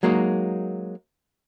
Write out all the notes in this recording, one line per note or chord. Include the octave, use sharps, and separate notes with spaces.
F#3 G#3 A#3 D#4 F#4